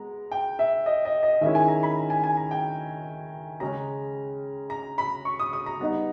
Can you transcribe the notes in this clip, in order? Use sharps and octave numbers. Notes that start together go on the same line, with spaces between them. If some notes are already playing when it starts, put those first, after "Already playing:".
Already playing: G#3 B3 A#5
G5
E5
D#5
D#5
D#5
D#3 G#3 C#4 E4 E5
G#5
A#5
B5
A#5
G#5
G#5
A#5
G5
C#3 G#3 C#4 A#5
A#5
B5
C#6
D#6
D#6
A#5
G3 B3 D#4